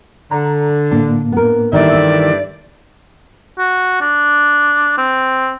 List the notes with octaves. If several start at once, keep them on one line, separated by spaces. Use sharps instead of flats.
D3 A#5
A2 A#3 D4
B3 A#4
G2 D#3 E3 A3 D5 E5
F#4
D4
C4